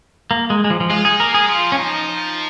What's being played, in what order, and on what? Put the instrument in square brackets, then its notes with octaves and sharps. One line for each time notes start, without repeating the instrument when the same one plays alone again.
[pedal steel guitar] A#3
G#3
G#3
F3
F3
[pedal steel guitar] G#3 [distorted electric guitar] F4
[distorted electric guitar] D#4 [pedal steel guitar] G#4
[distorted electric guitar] A#3 [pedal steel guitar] A#4
[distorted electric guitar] G#3 [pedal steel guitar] G#4
[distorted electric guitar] F3 [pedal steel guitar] F4
[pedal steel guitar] C#4
D#4